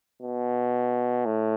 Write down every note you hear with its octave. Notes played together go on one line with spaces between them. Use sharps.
B2
A2